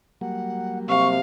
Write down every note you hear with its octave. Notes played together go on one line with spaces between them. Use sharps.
F#3 G3 A#3 F#5
C3 F5 C#6